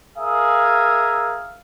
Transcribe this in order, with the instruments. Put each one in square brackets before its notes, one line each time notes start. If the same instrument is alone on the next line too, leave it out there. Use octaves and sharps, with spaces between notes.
[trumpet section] G#4 A#4 E5 F5